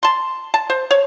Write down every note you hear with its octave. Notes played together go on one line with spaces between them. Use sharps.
A5 C6
A5
C5
C#5